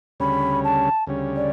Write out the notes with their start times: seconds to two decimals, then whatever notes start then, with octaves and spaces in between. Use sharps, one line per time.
0.20 D2 C#3 G3 C#4 B5
0.64 A5
1.07 D2 C#3 G3 C#4
1.36 D5